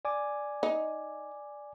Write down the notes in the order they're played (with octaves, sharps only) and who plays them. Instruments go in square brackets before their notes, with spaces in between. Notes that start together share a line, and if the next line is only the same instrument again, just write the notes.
[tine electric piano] D5 G#5 D6
[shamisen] D#4